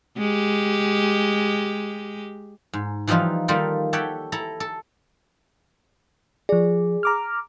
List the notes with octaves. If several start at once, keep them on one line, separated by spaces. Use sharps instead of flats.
G#3 G4
G#2
E3 F3 G3 D#4 F4
D#3 G3 A#3 F4 A4 A#4
G4 A4 C#5 E5 F#5 G5
E4 A4 A#5
A4
F3 G#4 D5
A#5 D6 F6